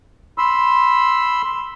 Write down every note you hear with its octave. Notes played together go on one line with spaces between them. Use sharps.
B5 C6 E6